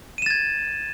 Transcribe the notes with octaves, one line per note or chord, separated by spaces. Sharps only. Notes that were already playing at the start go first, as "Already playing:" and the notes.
G#6 A6 D#7 E7